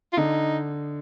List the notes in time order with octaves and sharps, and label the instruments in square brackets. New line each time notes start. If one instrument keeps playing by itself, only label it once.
[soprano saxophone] F4
[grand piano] D3 [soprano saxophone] D#4